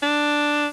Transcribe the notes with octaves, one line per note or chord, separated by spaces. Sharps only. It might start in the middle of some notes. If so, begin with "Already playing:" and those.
D4